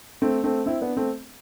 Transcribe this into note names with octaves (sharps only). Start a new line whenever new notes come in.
A3 C4
A3 C4
C4 E4
B3 D4
A3 C4